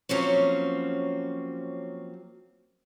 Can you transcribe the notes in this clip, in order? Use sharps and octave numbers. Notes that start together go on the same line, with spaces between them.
F3 F#3 A#3 C4 C#4